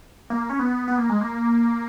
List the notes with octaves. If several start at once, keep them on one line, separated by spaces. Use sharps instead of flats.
A#3
C#4
B3
B3
A#3
G#3
A#3